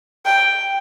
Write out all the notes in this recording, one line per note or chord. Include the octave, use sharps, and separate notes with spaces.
G5